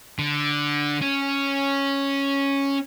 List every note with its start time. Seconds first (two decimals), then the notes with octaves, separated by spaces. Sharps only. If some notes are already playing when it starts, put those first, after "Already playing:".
0.19 D3
1.02 C#4